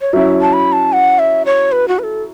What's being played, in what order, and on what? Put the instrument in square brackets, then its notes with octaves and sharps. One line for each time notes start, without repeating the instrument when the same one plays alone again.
[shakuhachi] C#5
[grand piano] F#3 C#4 E4 [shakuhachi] E5
[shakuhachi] A5
B5
A5
F#5
E5
C#5
B4
F#4
B4
A4